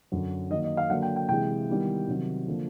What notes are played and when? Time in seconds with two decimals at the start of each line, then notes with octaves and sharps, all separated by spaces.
0.12 F#2 D3 F#3
0.50 D#3 F#3 A#3 D#5
0.64 D#5
0.77 F5
0.90 D3 F#3 A#3 D4 F#5
1.02 G5
1.16 G5
1.29 C3 E3 G#3 G5
1.69 D#3 G3 B3 E4
2.08 C3 D#3 F#3
2.47 D3 F3 A#3